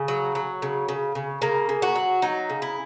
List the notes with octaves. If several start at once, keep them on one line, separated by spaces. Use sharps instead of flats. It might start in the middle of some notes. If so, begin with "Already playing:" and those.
Already playing: C#3
F#3
F#3
C#3
C#3
C#3
C#3 A#3
C#3
F#4
F#3
F#3 D#4
C#3
E4